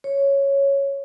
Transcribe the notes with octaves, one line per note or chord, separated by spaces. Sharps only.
C#5